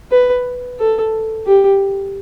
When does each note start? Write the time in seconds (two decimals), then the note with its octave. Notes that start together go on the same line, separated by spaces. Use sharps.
0.12 B4
0.80 A4
1.46 G4